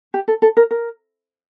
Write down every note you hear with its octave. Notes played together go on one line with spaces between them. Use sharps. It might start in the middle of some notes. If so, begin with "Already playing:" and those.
G4
A4
A4
A#4
A#4